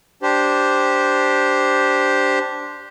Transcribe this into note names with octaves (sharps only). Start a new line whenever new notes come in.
D4 G4 C5